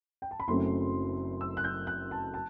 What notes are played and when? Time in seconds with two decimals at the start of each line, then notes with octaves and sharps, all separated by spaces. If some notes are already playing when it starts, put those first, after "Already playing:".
0.22 G5
0.31 A5
0.40 B5
0.48 F#1 F#2 F#3 A3 C4 C6
1.41 E6
1.57 F#6
1.64 G6
1.87 F#6
2.11 A5
2.34 A5